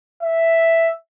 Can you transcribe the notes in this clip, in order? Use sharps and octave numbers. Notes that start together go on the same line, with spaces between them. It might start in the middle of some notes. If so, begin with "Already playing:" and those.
E5